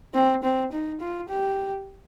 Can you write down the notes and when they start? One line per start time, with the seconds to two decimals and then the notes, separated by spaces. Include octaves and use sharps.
0.14 C4
0.43 C4
0.72 D#4
1.01 F4
1.29 G4